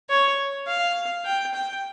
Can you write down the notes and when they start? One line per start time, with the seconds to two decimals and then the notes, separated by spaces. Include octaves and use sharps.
0.09 C#5
0.67 F5
1.25 G5
1.54 G5